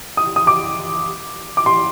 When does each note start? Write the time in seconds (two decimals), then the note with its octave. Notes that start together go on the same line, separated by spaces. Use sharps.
0.17 D#6
0.36 D#6
0.47 D6
1.57 D6
1.66 C6